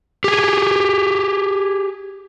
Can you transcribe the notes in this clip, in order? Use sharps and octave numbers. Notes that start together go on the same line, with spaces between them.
G4 G#4